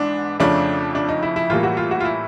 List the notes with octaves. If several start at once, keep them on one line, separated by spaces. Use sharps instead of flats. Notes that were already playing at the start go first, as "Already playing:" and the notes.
Already playing: G#2 E3 B3 D4
F2 C#3 F3 A3 C#4 D4
D4
D#4
E4
E4
A2 E3 G3 A#3 F4
F#4
F4
F#4
F4
E4